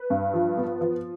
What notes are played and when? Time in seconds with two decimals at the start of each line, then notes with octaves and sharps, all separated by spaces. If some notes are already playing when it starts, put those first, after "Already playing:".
Already playing: B4
0.10 G2
0.34 F3
0.57 B3
0.81 F3